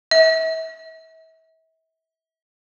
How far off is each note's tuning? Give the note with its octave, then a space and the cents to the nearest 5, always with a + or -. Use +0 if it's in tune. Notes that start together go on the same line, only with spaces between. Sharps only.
E5 -35